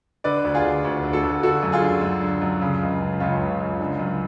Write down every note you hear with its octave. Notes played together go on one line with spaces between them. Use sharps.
D3 B4 D5
D2
F4 G#4
D3
D2
D3
F#4 A4
D2
D3 F#4 A4
F#2
F4 G#4
D3
F#2
D3
F#2
C#3
C#2
C#3
C#2 C#4 F4
C#3
C#2
D3
F#2